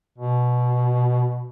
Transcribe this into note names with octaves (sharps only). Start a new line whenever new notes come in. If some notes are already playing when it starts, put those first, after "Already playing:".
B2